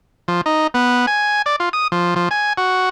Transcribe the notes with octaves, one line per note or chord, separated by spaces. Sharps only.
F3
D#4
B3
G#5
D5
F4
D#6
F3
F3
G#5
F#4